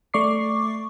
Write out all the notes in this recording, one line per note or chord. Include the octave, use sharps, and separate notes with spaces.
A3 D5 C#6 D6 C7